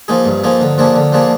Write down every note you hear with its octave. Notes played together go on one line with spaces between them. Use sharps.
F3 A#3 D#4 G#4
G2
F3 A#3 D#4 G#4
D3
F3 A#3 D4 G#4
D3
F3 A#3 D4 G#4